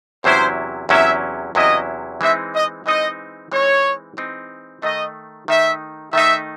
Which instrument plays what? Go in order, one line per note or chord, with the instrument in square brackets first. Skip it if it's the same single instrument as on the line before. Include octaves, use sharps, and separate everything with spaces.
[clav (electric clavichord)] E2 C3 F#3 C#4 E4 [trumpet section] C5
[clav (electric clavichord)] E2 C3 F#3 C#4 E4 [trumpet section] E5
[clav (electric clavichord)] E2 C3 F#3 C#4 E4 [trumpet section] D#5
[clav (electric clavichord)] E3 G#3 C4 D#4 [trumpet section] E5
[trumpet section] D#5
[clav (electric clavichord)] E3 G#3 C4 D#4 [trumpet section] D#5
[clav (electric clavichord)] E3 G#3 C4 D#4 [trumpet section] C#5
[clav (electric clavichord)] E3 G#3 C4 D#4
[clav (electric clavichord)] D#3 A3 D#4 [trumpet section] D#5
[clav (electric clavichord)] D#3 A3 D#4 [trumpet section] E5
[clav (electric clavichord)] D#3 A3 D#4 [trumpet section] E5